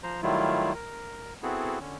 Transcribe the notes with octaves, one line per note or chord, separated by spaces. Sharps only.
F3 C5 A#5
D#3 F#3 G3 A3 E4 F4
A#4
B3 C4 E4 F#4 G#4 A4
D3 C#4